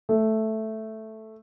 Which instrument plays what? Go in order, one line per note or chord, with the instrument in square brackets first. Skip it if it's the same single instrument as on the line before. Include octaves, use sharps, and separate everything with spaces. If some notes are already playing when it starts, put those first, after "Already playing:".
[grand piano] A3